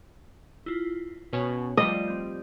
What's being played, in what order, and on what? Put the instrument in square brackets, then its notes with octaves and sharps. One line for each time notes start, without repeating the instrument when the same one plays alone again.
[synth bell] E4 F4
[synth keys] B2 C#4 C#5 [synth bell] B4
[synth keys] F3 G3 [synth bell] A3 F4 [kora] D#5
[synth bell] C4 G6